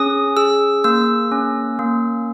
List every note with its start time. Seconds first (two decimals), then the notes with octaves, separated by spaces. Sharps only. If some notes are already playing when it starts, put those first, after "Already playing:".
Already playing: C#4 G#4 D#6
0.37 G#4 E6
0.84 A#3 E6
1.32 C#4
1.79 A#3